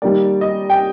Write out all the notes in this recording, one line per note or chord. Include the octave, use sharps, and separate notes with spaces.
D#3 G3 A#3 D5
D#5
G5